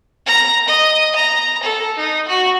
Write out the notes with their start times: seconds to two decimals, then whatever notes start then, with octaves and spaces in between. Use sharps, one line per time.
0.27 A#5
0.68 D#5
1.15 A#5
1.63 A4
1.97 D#4
2.28 F#4